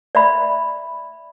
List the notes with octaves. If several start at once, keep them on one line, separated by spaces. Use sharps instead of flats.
D5 E5 B5